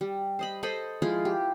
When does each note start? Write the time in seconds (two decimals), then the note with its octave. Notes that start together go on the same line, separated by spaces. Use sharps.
0.01 G3
0.39 C5 D#5 B5
0.63 A4 C5 D#5 B5
1.02 F3 G#3 E4 F4
1.25 G4